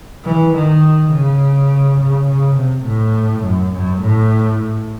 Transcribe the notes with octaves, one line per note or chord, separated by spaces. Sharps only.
E3
D#3
C#3
C#3
C#3
C3
A2
F#2
F#2
A2